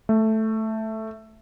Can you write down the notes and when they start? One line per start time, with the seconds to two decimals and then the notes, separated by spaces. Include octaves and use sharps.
0.09 A3